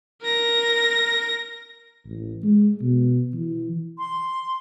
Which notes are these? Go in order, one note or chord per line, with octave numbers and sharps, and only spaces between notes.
A#4 A#6
A1
G#3
B2
E3
C6